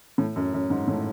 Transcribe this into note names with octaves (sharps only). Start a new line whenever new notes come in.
A2
F#2
F#2
G#2
A2